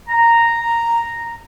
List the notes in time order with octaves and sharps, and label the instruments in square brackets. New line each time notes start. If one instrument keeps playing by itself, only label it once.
[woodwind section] A#5